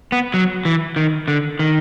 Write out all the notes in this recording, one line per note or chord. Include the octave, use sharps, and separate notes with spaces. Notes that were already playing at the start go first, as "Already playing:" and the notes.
B3
F#3
E3
D#3
D3
D#3